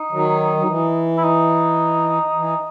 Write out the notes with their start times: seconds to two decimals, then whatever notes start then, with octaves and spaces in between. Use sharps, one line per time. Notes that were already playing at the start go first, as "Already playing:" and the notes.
Already playing: D#4
0.11 D#3 F#3
0.57 F#3
0.68 E3
1.17 E4
1.24 D#4
2.35 E3